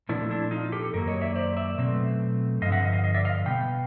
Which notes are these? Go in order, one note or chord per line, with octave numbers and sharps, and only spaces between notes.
A#2 F3 A3 C4 D4 E4
D4 E4
D#4 F4
G4 A4
F#2 D#3 F#3 A#3 A#4
C#5 D#5
D5 E5
C5 D5
D5 E5
B2 F#3 A3 C4
G2 D3 F3 D#5 F5
E5 F#5
D#5 F5
D#5 F5
D#5 F5
D5 E5
D#5 F5
B2 G3 B3 F5 G5